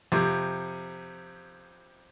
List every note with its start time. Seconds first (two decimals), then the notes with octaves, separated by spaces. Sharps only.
0.12 F2 C3